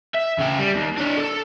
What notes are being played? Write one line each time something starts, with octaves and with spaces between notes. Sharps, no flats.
E5
C#3 G5
G3
D#2
D4 C#5
A4